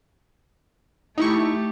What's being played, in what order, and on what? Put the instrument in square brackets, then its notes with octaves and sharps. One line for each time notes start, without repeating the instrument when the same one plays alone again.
[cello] A3 G4 [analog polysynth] D#4 E4 C#6